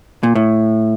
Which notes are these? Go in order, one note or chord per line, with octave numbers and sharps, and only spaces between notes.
A#2
A2